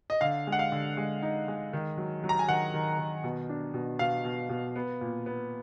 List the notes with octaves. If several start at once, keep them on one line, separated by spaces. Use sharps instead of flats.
D#5
D3 F5
G#3
F#5
F5
D3
G#3
D#4
G#3
D#3
F#3
F#3
A#5
G#5
D#3 F#5
D#3
D#3
B2
D4
B2
B2 F5
B2
B2
B3
A#2
B3